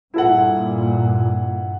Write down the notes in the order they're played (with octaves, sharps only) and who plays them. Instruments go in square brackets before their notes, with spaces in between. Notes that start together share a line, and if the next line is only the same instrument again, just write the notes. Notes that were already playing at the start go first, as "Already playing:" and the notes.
[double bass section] G2 A#2 [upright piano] E4 A4 F#5